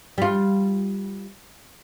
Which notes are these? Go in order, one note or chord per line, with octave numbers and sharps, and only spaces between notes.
G3 F4